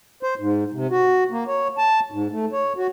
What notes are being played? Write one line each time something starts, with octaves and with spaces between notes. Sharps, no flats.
C5
G#2
C3
F#4
A#3
C#5
A5
G#2
A3
C#5
F#4